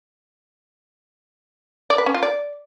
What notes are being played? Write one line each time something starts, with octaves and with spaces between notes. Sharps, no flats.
D5
B4
C#4
F4
D5